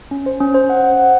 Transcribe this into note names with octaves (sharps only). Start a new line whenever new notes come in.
C#4
C5
C#4
C5
F#5
F#5
F#5